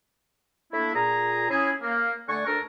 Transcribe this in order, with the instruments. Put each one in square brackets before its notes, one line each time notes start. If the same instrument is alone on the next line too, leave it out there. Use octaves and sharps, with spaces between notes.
[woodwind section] A3 A#3 D4 E4
A#2 G#4 A#5
C#4 E4 G#4
A#3
D3 A3 D5 F#5 G#5 C#6
D2 D4 A4 A#4